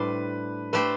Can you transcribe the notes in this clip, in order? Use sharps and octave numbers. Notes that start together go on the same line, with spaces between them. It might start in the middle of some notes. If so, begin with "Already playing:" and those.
Already playing: A2 G3 D4 B4 C5
A3 D4 G4 B4 C5